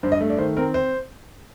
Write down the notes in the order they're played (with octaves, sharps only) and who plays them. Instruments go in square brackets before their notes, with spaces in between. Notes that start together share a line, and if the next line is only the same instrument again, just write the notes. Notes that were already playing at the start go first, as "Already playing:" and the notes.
[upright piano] G2 C5
D#5
A3
D5
D#3 C5
C4 A#4
C5